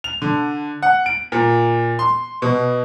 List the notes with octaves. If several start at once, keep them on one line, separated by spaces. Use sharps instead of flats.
F7
D3
F#5
D7
A#2
C6
B2